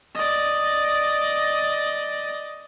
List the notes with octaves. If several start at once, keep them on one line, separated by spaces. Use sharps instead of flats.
D5 D#5